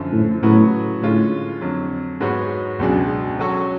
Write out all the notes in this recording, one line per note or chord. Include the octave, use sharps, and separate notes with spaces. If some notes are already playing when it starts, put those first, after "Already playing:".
Already playing: F#2 D3 F3
A2
A2 C#3 F#3 B3 F#4
A2 D3 G#3 C#4 F4
F2 D3 F#3
G#2 G#3 B3 F#4 C#5
C#2 F#2 B2 G#3 D4 G#4
F#3 C#4 F#4 A4 C#5